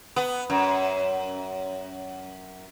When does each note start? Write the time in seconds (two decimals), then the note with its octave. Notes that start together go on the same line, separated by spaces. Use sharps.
0.16 B3
0.50 F#2